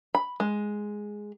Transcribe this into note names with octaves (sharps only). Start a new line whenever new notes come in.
B5
G#3